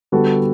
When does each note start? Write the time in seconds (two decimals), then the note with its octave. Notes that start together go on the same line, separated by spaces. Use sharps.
0.12 D3 G3 B3 F#4 A4